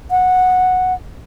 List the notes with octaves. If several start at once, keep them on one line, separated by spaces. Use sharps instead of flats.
F#5